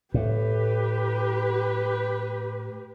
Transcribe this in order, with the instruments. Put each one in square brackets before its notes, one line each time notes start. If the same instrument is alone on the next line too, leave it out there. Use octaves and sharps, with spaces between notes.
[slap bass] A2 [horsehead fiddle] G4 B4